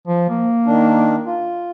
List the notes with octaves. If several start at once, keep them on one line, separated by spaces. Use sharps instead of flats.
F3
A#3
D#3 D4
F4